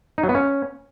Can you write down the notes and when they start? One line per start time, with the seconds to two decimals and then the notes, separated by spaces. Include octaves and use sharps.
0.18 D#4
0.24 F#3
0.29 B3
0.35 C#4